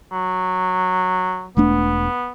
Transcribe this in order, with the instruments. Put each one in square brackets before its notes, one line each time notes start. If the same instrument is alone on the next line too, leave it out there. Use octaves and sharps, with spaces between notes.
[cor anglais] F#3
[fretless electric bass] E1 A3 D4 [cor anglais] B3